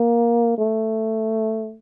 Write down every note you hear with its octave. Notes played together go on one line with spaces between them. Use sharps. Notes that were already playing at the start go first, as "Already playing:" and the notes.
Already playing: A#3
A3